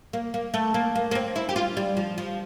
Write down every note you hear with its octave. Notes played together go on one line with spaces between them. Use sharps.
A#3
A#3
A3
A#3
A#3
A#3
C4
E4
G4
F4
G3
F3
F3